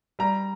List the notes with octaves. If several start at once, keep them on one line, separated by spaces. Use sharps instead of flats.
G3 A#5